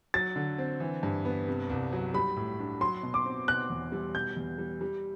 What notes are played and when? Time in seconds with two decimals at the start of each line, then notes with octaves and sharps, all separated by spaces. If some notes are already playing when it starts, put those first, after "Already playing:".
0.14 F#3 A6
0.36 D3
0.58 C4
0.80 E3
1.03 G2
1.25 B3
1.48 C3
1.69 C2
1.93 F#3
2.14 G3 B5
2.36 A2
2.59 D4
2.81 F#3 C6
3.03 B2
3.14 D6
3.25 C4
3.48 B2 F#6
3.70 E2
3.92 G3
4.15 B2 G6
4.36 E2
4.59 G3
4.81 G3